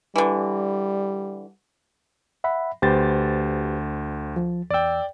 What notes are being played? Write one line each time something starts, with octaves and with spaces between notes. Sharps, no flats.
D3 E3 G3
E5 F#5 B5
D2 G4 B4 C5 A6
F3
E2 D5 G5 E6